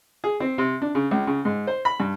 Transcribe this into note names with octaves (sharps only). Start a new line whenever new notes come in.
G#4
C4
C3
D4
C#3
C#2
C#3
G#2
C5
B5
G2